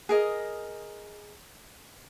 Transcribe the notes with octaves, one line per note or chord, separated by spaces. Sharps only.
G#4 A#4 D#5